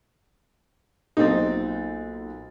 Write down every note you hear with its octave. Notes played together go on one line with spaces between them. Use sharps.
B1 A#2 C4 D#4 A6